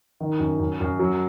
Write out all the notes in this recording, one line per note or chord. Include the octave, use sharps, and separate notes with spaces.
D#3
F#2
F#2
F#2
F#3